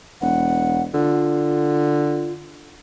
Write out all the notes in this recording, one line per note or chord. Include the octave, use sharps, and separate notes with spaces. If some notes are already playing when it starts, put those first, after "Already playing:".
E1 F#5
D3 F4